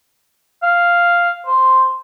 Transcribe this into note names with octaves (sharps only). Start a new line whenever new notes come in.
F5
C5